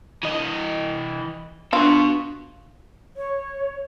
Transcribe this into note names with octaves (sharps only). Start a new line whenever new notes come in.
E3 D#5
B2 D4 F4 F#4
C#5